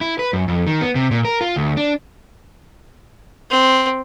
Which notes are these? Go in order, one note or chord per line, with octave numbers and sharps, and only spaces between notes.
E4
B4
F#2
F2
D#3
B3
C3
A#2
A#4
F4
D2
D4
C4